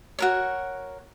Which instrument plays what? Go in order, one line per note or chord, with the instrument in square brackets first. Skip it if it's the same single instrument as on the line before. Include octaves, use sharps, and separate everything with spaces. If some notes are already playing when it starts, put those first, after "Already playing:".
[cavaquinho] F#4 A#4 C#5